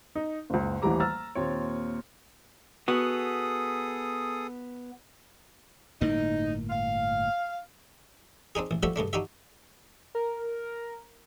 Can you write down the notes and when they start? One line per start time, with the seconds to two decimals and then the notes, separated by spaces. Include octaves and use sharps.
0.15 D#4
0.50 F#1 C#2
0.82 D#1 A1 E3 G3 A#5 D6
1.00 A#5 E6 F6 A6
1.35 D#2 A#2 C4 C#5
2.88 B3 F#4 G#4 A4 D#6
6.01 G1 A2 A#3 D#4
6.70 F5
8.55 C4 D4 D#4 G#4
8.71 A1
8.83 F3 G3 A3 D4 F#4 E5
8.96 G2 C#3 A3 D4
9.13 D4 D#4 F#4 G4 E5
10.15 A#4